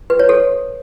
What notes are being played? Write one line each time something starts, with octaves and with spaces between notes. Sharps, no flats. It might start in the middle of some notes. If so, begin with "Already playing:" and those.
B4
C#5
A4